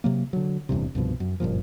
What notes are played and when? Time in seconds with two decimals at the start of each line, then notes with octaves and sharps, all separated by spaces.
0.04 C3 F#3 A#3
0.33 D3 F#3
0.69 D#1 E2 G2 C3
0.95 C2 G2 B2 F3
1.20 F#2
1.40 F#1 G2 A#2 F3